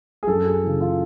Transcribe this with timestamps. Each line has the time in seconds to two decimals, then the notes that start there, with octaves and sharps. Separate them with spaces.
0.23 G#4
0.27 F#2 A4
0.45 G#4
0.64 C#3 E3
0.81 F4